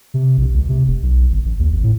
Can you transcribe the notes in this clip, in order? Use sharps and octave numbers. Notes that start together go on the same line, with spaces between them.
C3
A#1
C#2
C3
F1
B1
G1
A1
D#2
G#1
A2